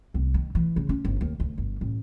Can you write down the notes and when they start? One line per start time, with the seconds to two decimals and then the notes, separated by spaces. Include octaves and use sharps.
0.14 C2
0.34 D#3
0.55 E3
0.76 C#3
0.89 C#4
1.05 G1
1.21 D#2
1.40 D2
1.58 G1
1.81 A1